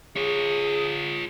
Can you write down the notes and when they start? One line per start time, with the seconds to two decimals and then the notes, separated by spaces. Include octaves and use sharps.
0.16 F4 G#4 C#5